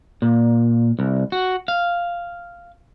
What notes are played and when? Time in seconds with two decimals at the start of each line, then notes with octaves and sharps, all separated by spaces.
0.22 A#2
0.99 C2
1.32 F#4
1.68 F5